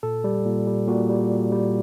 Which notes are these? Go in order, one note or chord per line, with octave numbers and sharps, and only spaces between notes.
A#2 A4
G3
A#2
G3
A#2 F#4
G3
A#2
G3